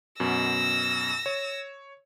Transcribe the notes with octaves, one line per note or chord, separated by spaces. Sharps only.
F#2 B2 E6 A#6
C#5